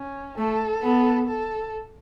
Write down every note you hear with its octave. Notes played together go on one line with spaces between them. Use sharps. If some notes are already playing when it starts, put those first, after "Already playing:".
Already playing: C#4
A3 A4
B3
A4